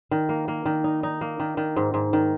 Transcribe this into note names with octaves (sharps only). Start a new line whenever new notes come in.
D#3
A#3
A#3
D#3
D#4
D#4
A#3
D#3
D#3
G#2
G#2
D#3